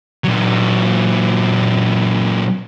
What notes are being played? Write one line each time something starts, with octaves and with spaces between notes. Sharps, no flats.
A#2 F#3